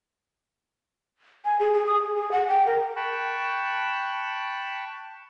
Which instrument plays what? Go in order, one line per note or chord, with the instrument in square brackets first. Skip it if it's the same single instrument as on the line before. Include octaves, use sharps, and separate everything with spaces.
[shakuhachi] G#5
G#4
G#4
D#6
G#4
G#4
F#5
G5
A#4
[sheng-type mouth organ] G5 A5 B5 C#6 F#6